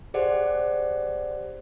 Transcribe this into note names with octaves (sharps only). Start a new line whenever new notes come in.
G4 G#4 C5 D5 F#5